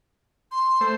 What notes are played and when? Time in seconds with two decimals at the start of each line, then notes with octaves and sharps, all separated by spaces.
0.52 C6
0.81 A3 C5